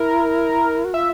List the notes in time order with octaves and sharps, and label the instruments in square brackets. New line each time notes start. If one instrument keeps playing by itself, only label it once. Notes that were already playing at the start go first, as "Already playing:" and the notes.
Already playing: [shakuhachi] E4 [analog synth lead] A#4
[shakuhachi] F#4
[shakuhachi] F4 [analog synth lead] E5